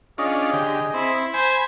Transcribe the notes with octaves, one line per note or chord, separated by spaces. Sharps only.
C#4 D4 F4 G#4 D#5
D3 G4
C4 E4
C5 G#5 B5